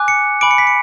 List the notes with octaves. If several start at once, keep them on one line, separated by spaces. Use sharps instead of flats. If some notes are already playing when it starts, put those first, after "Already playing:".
Already playing: G#5 D6 F#6
C#7
G#5 B5 D6 D7
C#7
B6
C#7